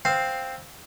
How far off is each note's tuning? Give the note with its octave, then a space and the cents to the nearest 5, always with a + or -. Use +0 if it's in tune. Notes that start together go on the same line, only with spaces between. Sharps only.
C4 +0 F5 +5